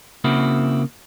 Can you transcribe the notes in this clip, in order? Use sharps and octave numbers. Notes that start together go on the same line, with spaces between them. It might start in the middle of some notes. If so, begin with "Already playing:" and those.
C#3 A#3 C4 E4 F#4